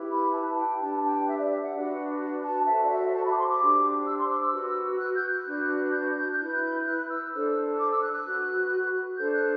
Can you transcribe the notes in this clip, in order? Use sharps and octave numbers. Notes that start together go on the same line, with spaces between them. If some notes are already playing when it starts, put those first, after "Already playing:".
Already playing: E4 G4 B4
B5
A5
G5
D4 G4 B4 A5
G5
E5
D5
E5
F#5
D4 F#4 B4
A5
F#4 A4 C5 E5
D5
E5
A5
B5
D6
C6
D6
D4 G4 C5
E6
C6
D6
E6
F#4 B4
F#6
G6
F#6
D4 F#4 B4
G6
G6
F#6
E4 B4 G6
F#6
G6
F#6
E6
D4 A4 C5
D6
E6
F#6
F#6
F#4 B4
D4 A4 C5 G6
F#6